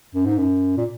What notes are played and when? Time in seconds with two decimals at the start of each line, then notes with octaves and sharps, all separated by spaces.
0.15 F#2
0.26 G#2
0.38 F#2
0.78 A#2